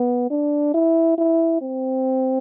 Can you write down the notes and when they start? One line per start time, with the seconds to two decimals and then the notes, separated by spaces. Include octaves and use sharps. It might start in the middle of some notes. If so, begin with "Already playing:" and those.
Already playing: B3
0.30 D4
0.74 E4
1.18 E4
1.61 C4